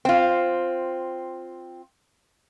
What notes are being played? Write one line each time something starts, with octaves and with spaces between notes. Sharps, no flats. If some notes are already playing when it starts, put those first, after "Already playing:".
C4 F4